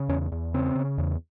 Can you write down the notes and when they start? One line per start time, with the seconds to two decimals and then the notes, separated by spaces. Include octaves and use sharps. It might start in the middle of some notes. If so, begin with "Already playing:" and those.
Already playing: C#3
0.09 E2 C#4
0.32 E2
0.54 C#3 C4
0.75 C#3
0.98 E2